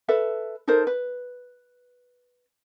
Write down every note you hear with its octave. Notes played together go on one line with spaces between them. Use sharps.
A4 B4 E5
D#4 A4 A#4 C5
B4